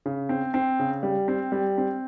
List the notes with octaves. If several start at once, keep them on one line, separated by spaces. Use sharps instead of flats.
C#3
C4
C4
C#3
G3
C4
G3
C4